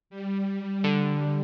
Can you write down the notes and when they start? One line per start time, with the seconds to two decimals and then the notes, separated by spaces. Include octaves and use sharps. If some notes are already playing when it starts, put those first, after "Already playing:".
0.10 G3
0.84 D3